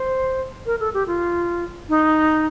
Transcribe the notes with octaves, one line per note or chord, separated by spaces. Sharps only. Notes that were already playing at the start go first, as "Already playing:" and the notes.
Already playing: C5
A#4
A4
G4
F4
D#4